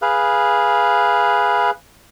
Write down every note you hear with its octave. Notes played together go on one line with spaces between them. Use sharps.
G#4 B4 F5